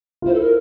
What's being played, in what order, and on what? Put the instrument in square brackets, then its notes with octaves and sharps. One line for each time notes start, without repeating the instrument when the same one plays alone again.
[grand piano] F4
[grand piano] E4 [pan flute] C5
[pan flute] A4
A#4